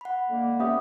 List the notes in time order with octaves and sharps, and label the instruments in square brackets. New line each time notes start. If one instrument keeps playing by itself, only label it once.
[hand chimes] F#5 B5
[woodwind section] D3 G#3 A#3
[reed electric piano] B3 C#4 G4 [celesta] E5 D#6